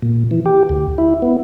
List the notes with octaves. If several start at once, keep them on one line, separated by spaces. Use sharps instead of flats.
A#2
E3
G4
D2
E4
B3